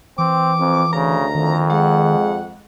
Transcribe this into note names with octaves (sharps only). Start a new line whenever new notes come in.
E3 C4 D6
F2 C4
D2 C#3 A#5
F2 D#3
G#3 F#5